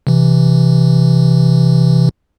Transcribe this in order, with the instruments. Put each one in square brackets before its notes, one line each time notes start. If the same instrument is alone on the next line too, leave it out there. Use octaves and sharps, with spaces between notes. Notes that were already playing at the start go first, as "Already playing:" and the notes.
[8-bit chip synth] C3 E3